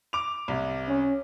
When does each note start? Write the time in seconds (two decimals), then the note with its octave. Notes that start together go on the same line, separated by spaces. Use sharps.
0.13 D6 F7
0.48 C2
0.88 C#4